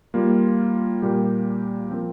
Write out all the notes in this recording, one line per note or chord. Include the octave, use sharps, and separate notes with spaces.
G3 A#3 F4
A#2 G3 A#3 G4
F3 C4 A#4